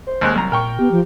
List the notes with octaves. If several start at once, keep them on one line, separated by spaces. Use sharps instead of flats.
C5
D#2 G#3 F#6
C2 F#3 A#5
A#2 A#4 G5 C#6
B3 G4
F3